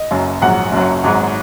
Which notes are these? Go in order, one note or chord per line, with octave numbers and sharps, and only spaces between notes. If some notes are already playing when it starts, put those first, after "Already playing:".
Already playing: D#5
F#1 F#2 F#3
A#1 G#2 F#3 F#5
F#1 F#2 F#3
G#1 G#2 F#3